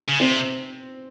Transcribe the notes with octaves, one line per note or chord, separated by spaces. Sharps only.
C#3
C3 C4